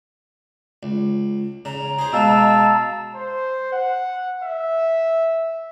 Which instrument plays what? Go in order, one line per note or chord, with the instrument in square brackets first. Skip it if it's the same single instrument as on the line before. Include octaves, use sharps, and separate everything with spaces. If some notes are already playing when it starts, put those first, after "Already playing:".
[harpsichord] C#2
[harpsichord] C#3 [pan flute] A#5
[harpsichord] G#4 C5
[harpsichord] B2 G#3 [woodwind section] F5 A5 E6
[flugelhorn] C5
F#5
E5